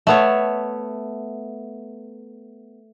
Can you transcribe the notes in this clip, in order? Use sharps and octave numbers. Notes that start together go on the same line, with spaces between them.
A3 B3 C#5